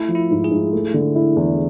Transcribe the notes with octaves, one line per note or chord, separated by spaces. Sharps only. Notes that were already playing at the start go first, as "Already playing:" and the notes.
Already playing: A3 E4
F3
E4
G#2
G#4
G#2
A3
D3
E4
E2